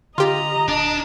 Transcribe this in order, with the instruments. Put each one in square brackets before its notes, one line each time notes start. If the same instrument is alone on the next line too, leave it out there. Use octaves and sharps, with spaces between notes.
[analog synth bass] D3 [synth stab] F4 G4 [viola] D#5 A#5
[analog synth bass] D#1 [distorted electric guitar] D4